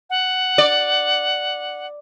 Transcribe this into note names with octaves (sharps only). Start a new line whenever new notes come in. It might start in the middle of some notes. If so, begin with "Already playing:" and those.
F#5
D5